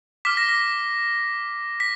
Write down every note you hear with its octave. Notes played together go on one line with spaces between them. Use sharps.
D6 F6 B6
A#6
B6
B6